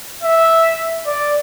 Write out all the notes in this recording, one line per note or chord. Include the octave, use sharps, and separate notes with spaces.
E5
D5